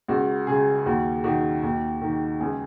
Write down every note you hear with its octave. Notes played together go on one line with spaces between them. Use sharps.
C#2 F#4
C#3 G#4
D#2 F#4
D#3 F#4
D#2
D#3
C#2 G#4